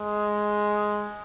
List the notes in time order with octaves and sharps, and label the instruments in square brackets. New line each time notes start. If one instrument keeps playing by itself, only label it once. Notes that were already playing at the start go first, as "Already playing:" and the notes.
Already playing: [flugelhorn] G#3